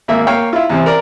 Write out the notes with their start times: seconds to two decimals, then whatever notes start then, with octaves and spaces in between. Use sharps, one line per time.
0.08 G#1 A#3 E5
0.27 A#3 C#5 F5 G5
0.53 E4 F4
0.70 E2 C3 C4
0.86 A#4 D5 A#5